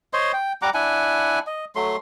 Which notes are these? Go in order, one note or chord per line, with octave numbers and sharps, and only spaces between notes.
C5 C#5 D#5 C6
G5
G3 F#5 A#5 D6
D4 E4 F#5 G#5
D#5
F#3 A3 C6